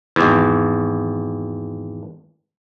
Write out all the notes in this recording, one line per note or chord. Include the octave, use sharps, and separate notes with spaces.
G#1 E2